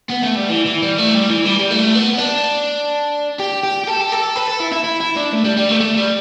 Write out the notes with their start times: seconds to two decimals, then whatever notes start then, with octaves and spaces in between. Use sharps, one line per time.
0.10 B3
0.23 A3
0.36 G3
0.50 E3
0.66 E3
0.82 G3
0.98 A3
1.15 G3
1.30 E3
1.46 G3
1.60 G3
1.71 A3
1.95 B3
2.14 B3
2.18 D4
3.40 G4
3.63 G4
3.84 G4
3.87 A4
4.01 G4
4.12 A4
4.36 B4
4.48 A4
4.60 E4
4.72 E4
4.84 E4
5.01 E4
5.17 D4
5.33 A3
5.45 G3
5.57 G3
5.69 A3
5.80 A3
5.97 G3